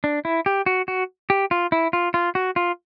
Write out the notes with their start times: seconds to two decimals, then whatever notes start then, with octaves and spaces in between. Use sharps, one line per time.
0.04 D4
0.25 E4
0.46 G4
0.66 F#4
0.88 F#4
1.30 G4
1.51 F4
1.72 E4
1.93 F4
2.14 F4
2.35 F#4
2.56 F4